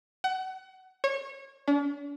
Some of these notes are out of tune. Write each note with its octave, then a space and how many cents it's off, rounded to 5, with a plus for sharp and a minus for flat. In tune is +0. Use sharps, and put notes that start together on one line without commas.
F#5 +25
C#5 -25
D4 -45